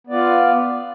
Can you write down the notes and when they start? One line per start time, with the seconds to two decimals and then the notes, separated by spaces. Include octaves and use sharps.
0.07 B3
0.10 D5
0.13 F4